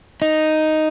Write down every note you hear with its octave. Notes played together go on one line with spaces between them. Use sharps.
D#4